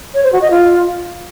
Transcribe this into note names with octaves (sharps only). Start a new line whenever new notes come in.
C#5
C5
F#4
D#5
F4